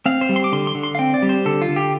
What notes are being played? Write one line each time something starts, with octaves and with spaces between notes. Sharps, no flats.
C4 F5
C5
G3
C6
D6
D3 C6
C6
D3
C6
F5
C4 G5
D5
G3
C5
D3 A4
F4
D3
G4